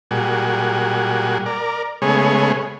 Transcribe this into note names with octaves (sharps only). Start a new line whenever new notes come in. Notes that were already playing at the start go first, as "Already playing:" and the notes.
A#2 G3 F#4 G#4
A#4 D5
C#3 G#3 A3 B3 G#4 C#5